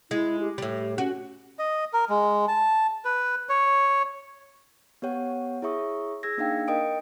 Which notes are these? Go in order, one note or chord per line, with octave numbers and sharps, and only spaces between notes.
G#3 E4
G4
A2 G3
C#4 F#4
D#5
A#4
G#3
A5
B4
C#5
B3 G4 C#5 F#5
E4 G#4 C#5 E5 C#6 D#6
G#4 E6 G#6 A#6
A#3 D4 D#4 F5 G5
A#4 D#5 G5 D#6 D7